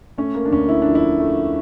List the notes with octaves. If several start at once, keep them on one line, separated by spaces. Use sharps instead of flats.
A3 C#4
A#3
D4
D2 C#4
E4
F3 D4
E4
A3